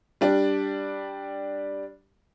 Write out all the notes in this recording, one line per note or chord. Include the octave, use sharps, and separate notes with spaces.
G3 D4